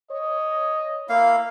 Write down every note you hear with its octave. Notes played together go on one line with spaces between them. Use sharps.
C#5 D#5
A#3 E4 F5